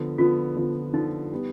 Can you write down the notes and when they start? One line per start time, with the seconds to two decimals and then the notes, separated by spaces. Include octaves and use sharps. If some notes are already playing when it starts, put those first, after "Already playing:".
Already playing: D3 F3 B3
0.18 D3 F3 B3 F4
0.56 D3 F3 B3
0.94 D3 F3 B3 D#4
1.32 G3 B3